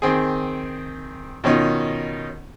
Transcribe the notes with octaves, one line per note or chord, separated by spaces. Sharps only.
D#3 C4 G#4
B2 D#3 C#4 D#4 F4